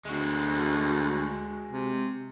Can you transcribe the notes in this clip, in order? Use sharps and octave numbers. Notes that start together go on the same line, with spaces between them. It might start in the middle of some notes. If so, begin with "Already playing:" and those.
D2 G#3 F#4
C3